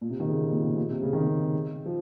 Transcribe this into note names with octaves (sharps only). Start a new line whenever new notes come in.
A#2
C3
D#3
C#3
C3
A#2
C3
A#2
C3
C#3
D#3
C#3
F3